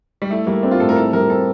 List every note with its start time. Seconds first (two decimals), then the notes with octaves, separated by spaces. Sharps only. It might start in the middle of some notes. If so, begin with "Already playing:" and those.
0.22 G3
0.30 A3 E4
0.46 G3 A#3
0.63 C4 D4
0.71 F4
0.80 A2 A4
0.89 A#4
0.96 E4 A4
1.13 G3 A#4
1.30 C4 A4